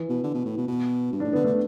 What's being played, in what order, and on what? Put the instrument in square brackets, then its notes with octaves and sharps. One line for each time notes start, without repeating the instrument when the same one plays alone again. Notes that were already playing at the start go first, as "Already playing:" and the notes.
Already playing: [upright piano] E3
[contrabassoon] B2
D3
B2
A2
B2
B2
G2
[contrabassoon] A2 [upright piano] D4
[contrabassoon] D3 [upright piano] B3
[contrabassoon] D3 [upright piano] A3